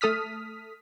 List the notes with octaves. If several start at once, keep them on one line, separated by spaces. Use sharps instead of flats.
A3 A4 D#6 F6 B6